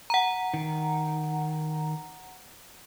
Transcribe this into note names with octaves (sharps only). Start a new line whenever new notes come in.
F#5 A#5
D#3